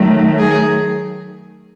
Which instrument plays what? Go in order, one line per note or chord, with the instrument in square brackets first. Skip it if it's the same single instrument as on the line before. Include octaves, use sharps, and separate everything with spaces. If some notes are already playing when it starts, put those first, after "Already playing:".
Already playing: [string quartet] D#3 F#3 A3
G#4